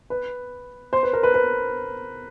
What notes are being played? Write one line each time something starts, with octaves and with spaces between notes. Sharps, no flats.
B4
C5
B4
A#4
B4
B4